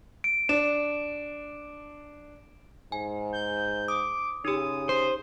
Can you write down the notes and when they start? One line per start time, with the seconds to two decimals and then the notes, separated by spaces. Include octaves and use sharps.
0.24 D7
0.49 D4 E7
2.92 G#2 G#5
3.33 G6
3.88 D6 D#6
4.45 C#3 D#4 G4 D#6
4.89 C5